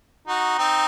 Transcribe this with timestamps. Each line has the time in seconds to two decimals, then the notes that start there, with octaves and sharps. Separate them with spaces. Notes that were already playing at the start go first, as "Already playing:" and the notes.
0.28 D#4 F#4
0.58 C4 D#4